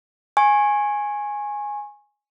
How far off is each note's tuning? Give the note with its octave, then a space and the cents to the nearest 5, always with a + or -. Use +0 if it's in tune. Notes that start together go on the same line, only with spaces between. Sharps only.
G#5 +0 C#6 -35